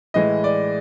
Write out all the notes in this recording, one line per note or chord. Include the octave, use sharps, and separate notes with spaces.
A2 E3 G#3 D#5
D5